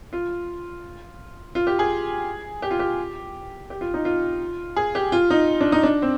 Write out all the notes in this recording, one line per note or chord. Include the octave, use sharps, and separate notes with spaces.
F4
F4
G4
G#4
G4
F4
G4
G4
F4
D#4
F4
G#4
G4
F4
D#4
D4
D#4
D4
C4